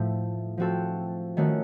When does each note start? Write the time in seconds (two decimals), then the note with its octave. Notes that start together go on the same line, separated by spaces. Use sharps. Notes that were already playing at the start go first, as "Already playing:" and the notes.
Already playing: A2 F3 A3
0.58 F3 C4 F#4 A4
1.37 D#3 A3 C#4 F#4